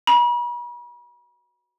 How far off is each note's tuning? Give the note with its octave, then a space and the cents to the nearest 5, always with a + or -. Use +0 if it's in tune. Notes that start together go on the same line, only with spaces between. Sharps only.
B5 -45